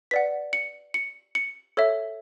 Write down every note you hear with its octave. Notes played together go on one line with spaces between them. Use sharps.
B4 D5 F#5 B6
C#7
C#7
C#7
A4 C#5 E5